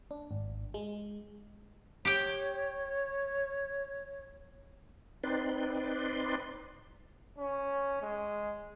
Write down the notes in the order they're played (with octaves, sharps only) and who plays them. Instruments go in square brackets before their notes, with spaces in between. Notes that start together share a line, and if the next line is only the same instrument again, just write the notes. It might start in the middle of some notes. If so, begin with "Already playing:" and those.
[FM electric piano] D4
G#1
G#3
[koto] G4 G5 [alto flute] C#5
[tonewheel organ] C4 D#4 B4 D5 C6
[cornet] C#4
G#3